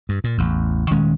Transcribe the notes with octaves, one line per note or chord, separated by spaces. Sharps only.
G2
A#2
A1 E2
D#1 D#3 G#3 C#4